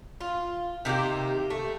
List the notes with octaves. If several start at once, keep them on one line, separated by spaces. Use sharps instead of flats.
F4
C3 D#3 A#3 G4
A3